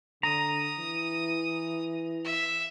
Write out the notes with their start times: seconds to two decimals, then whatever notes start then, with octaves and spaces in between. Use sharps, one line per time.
0.23 D3 A#5 D#6
0.78 E3
2.24 E5